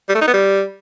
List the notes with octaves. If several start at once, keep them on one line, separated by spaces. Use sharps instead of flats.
G3
A3
D#4
B3
G3